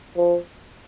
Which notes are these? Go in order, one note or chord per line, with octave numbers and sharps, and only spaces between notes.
F3